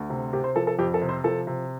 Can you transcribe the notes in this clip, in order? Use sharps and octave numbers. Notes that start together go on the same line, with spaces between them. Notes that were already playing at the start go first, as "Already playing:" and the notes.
Already playing: D2
C3
C3 G4
C5
F3 A4
A4
F2 G4
A4
C3
C5
F3 A4
C3